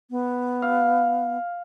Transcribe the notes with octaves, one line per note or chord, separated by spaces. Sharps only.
B3
F5